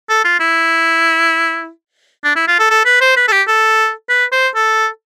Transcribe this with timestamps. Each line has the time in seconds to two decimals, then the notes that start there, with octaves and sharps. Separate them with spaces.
0.09 A4
0.25 F4
0.40 E4
2.24 D4
2.36 E4
2.48 F4
2.59 A4
2.70 A4
2.86 B4
3.01 C5
3.17 B4
3.28 A4
3.32 G4
3.48 A4
4.09 B4
4.32 C5
4.55 A4